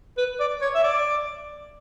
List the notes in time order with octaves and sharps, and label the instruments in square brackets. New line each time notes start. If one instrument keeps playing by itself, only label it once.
[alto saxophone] B4
D5
C#5
E5
D5